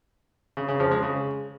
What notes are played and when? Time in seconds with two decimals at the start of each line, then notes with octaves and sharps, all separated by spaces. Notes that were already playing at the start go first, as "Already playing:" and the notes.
0.57 C#3
0.68 C#3
0.80 F3
0.91 G#3
1.03 C#3